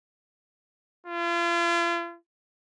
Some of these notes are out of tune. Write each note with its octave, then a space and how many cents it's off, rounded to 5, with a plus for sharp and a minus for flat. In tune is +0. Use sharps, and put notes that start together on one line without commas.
F4 -40